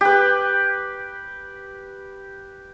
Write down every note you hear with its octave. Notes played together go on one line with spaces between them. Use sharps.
G4 B4